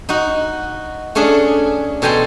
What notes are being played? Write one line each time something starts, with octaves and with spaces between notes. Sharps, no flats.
D#4 F#4
A3 C#4 D4 G#4
B2 A4 G5 G#5 A#5 C6